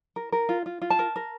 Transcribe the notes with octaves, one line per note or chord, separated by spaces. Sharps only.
A#4
A#4
F4
F4
F4
A5
A#4
A#4